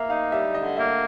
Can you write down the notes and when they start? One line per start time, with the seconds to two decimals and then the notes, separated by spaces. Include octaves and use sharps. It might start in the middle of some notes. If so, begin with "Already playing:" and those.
Already playing: A#3 E5
0.10 D#4 F5
0.31 G3 E5
0.54 D3 D#5
0.77 A#3 E5